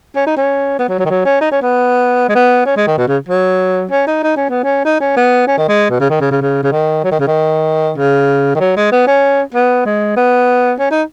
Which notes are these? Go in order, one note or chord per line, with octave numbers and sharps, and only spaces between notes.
C#4
D#4
C#4
B3
F#3
F#3
D#3
F#3
C#4
D#4
C#4
B3
G#3
B3
C#4
G#3
D#3
B2
C#3
F#3
C#4
D#4
D#4
C#4
B3
C#4
D#4
C#4
B3
C#4
D#3
G#3
B2
C#3
D#3
C#3
C#3
C#3
C#3
D#3
F#3
D#3
C#3
D#3
C#3
D#3
F#3
G#3
B3
C#4
B3
G#3
B3
C#4
D#4